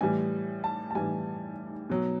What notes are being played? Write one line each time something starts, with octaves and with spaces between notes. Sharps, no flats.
A2 E3 G3 G#5
A5
A5
A2 E3 G3 G#5
B2 F#3